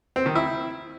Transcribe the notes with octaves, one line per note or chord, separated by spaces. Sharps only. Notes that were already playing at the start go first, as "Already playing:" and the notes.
C4
D#3
E4